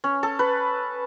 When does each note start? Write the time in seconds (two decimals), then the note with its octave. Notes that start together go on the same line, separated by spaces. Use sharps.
0.04 C#4
0.23 A4
0.39 B4